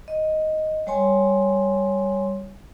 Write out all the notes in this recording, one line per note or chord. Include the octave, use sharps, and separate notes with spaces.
D#5
G3 C#5 G#5 C6